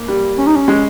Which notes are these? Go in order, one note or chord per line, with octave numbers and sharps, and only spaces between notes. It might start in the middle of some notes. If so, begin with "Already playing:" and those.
Already playing: A#3
G3
C#4
D#4
C#4
G#3